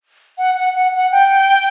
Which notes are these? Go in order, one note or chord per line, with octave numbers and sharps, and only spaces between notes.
F#5
F#5
F#5
F#5
G5